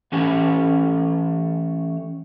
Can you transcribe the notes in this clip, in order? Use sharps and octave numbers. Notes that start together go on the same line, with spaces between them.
E3 A3 C#4 G4